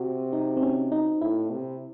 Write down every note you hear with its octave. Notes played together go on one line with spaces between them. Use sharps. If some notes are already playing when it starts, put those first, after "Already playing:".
Already playing: C3 F#4
D#4
C4
C#4
D#4
A2 E4
C3